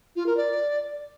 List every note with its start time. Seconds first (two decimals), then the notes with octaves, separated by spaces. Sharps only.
0.15 F4
0.26 A#4
0.36 D5